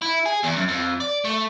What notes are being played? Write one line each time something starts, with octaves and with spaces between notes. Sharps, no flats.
E4
G#4
E2
F#2
F2
D5
A3